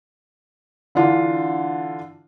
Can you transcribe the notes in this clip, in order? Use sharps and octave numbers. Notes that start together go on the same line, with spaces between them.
D3 E3 D4 F4